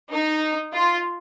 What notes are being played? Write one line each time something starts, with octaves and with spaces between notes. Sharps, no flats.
D#4
F4